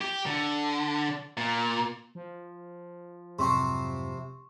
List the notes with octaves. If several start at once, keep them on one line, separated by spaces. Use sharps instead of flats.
G4
D3
A#2
F3
F2 G#2 C3 F#3 C4 C6 C#6